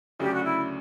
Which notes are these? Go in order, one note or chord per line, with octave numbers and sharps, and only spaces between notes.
D2 C#3 F#3 A3 D4 G4
F#4
E4